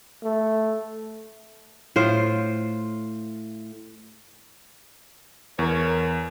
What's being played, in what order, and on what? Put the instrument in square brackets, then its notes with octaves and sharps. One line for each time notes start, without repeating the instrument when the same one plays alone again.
[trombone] A3
[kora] A2 F4 C5
[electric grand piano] E2 [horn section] A#4 C#5